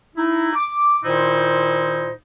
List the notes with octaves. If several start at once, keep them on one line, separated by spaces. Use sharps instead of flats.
D#4 E4
D6
A#2 D#3 D#4 E4 C5